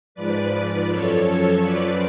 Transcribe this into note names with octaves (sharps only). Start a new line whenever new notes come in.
G#2 F3 B4 D5
B4 D5
F#2 F3 A4 C#5
A4 C#5
F#2 F3 B4 D5